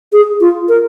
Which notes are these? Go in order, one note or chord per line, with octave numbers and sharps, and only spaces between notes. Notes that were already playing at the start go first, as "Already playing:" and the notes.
G#4
F4
A#4